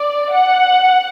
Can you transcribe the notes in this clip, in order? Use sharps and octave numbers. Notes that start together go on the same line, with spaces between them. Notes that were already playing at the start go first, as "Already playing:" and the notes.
Already playing: D5
F#5